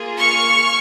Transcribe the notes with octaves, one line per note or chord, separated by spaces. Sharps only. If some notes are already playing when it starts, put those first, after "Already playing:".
Already playing: A#3 F4 G#4
C#6 F6